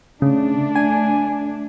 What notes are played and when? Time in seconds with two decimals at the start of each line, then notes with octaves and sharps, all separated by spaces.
0.22 C#3 A3 D4
0.76 G#5